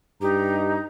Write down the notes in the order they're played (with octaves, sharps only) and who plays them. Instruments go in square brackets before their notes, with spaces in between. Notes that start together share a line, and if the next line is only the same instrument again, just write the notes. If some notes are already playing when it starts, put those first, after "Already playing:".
[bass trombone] G2 [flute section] D#4 A#5 [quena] G4